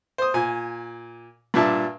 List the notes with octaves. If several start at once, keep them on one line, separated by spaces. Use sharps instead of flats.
C5 D#6
A#2 G#5
G2 A#2 D4 E5 A5